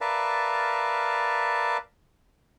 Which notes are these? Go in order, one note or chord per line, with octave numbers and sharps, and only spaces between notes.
A#4 B4 D5 E5 F5 A5